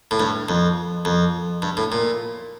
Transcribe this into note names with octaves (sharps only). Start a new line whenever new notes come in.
A2
G2
F2
F2
G2
A2
A#2